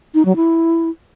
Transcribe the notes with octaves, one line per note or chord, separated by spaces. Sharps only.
D#4
F#3
E4